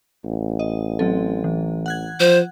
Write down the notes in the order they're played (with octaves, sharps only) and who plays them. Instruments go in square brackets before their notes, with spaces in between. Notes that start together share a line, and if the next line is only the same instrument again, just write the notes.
[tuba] A1
[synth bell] D#5
F#3 C4 A4
E3
F#5 F#6 G#6
[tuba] F3 [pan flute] C5